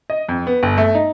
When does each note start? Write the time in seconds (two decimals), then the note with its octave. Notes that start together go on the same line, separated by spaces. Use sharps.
0.10 D#5
0.29 F2
0.47 B3
0.63 G1
0.77 A3
0.95 D#4